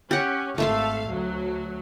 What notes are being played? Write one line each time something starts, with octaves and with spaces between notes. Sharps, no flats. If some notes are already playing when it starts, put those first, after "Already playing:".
C#4 G4 F#5
G#1 A3 A4 E5 F5 C6
D2 F#3